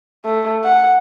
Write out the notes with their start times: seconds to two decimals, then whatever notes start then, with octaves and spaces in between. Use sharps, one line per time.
0.25 A3
0.64 F#5